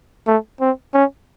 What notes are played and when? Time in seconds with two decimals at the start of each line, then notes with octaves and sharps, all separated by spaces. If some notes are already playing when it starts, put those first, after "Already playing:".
0.27 A3
0.61 C4
0.94 C#4